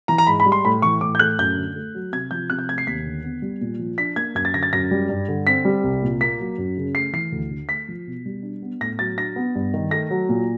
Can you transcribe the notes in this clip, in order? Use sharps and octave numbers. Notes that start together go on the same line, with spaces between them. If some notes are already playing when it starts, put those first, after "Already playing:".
E3 A#5
A#5
G#2 B5
B5
G3
C6
A2 B5
E3 C#6
A2 D6
G6
A3 F#6
F#2 G6
D3
A3
F#3
C3 G#6
F3 G6
C3 F#6
G6
A3 G#6
C7
D#2 B6
D3
B3
G3
A#2
F3
D4 B6
A#3 G#6
F#2 G#6
A6
D3 A#6
A6
F#2 A#6
G3
G2
D3
C4 B6
G3
C2
A#2
A#3 B6
F#3
F#2
C#3
A3 C7
E3 C7
D2
D3
A3 B6
F3
B2
G3
D4
B3
A2 A#6
F#3 A6
D4 A#6
B3
G2
D#3
A3 A#6
F#3
A#2